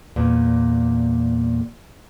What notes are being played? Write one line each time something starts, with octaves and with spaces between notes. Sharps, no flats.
E2 A#2